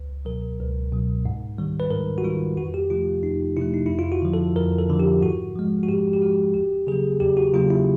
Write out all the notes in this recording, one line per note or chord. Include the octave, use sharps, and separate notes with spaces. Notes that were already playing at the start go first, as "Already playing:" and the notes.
Already playing: C#2
B2 F#3 A#4
C#2
B2 F#3
G#2
D#3 G3
B4
G#2 A#4
F#4
D#3 G3 F4
F2 F#4
G4
C3 F3 A3 F4
F2 D#4
C3 F3 A3 E4
D#4
F2 E4
F4
F#4
D3 F3
A4
F2 A#4
A4
D3 F3
G4
G#2 F#4
F3 G#3
F#4
G#2 G4
G4
F3 G#3 F#4
E2 G4
C#3 F#3 A#3 G#4
E2 G4
F#4
C#3 F#3 A#3 F4
E4